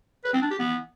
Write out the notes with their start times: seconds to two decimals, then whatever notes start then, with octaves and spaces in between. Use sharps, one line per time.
0.24 B4
0.33 C4
0.42 D4
0.51 G4
0.59 B3